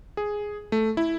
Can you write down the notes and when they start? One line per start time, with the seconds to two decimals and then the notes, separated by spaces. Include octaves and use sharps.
0.17 G#4
0.72 A3
0.97 E4